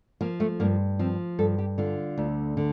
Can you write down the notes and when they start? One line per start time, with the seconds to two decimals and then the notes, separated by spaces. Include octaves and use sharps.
0.21 F3 A#3
0.40 A3
0.60 G2 A#3
0.99 F3 C4
1.39 G2 A4
1.58 G4
1.78 D3 F4
2.18 D2
2.57 D3